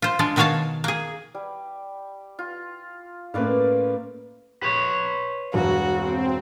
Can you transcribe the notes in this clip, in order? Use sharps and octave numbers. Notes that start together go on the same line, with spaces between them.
F4 C5
G#3 D4 F4
B2 D#3 F#4 C#5 F5 A5
A#3 G#4
G3
F4
A2 A#3 C#4 B4 D5 F5
B4 C#5
E1 G2 F#4
C4